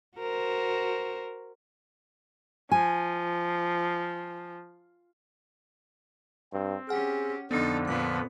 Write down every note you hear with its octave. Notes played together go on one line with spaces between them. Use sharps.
F#4 A#4 C5
F3 G#5
G2 C4
C#4 G4 G#4 F#5 F6
F2 D3 F3 B3 D4 D#4 A4
A#2 B3 D6